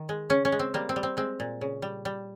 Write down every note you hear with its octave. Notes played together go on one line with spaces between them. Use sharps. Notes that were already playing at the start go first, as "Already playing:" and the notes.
Already playing: D#3
G#3
C#3 C#4
C#4
G#3
C4
G3 A#3
C4
G3
C4
G#3 C4
A#2
C#3
G3
G3